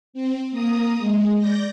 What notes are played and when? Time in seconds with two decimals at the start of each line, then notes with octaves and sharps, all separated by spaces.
0.13 C4
0.51 A#3 A#5 D#6
0.98 G#3
1.38 D5 G6 A#6